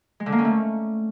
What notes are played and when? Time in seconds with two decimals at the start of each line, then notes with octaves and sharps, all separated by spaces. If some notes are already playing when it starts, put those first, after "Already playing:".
0.20 G#3
0.26 D3
0.32 A#3
0.38 C#4
0.45 A3